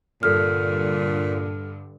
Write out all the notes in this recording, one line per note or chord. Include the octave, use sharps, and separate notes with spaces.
G2 A#2 D3 A4 F6